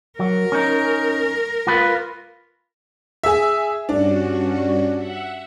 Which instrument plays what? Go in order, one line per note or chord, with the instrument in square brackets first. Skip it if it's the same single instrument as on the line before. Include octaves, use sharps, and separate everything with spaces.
[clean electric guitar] F#3 [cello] A#4
[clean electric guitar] C#4 D#4
F4 B4
[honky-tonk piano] G#4 E5
[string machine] G2 C#4 F#4 [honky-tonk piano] D4
[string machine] E5 F#5